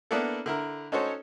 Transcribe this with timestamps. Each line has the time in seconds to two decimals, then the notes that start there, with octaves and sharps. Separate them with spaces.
0.11 A#3 B3 D4 E4 A4
0.46 D3 E4 A#4
0.92 C#4 D#4 F#4 A4 C5 C#5